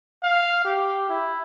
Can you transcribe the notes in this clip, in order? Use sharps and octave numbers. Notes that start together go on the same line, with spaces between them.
F5
G4
E4